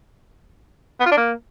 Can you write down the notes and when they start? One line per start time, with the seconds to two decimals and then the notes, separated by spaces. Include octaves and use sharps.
1.00 B3
1.06 F4
1.11 D4
1.17 A#3